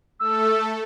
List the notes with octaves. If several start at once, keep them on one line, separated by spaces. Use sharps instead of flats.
A3 A4 E6